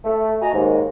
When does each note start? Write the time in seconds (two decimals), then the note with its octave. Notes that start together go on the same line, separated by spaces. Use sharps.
0.04 A3
0.42 F#4 D#5 G#5 A#5
0.53 D#2 G#2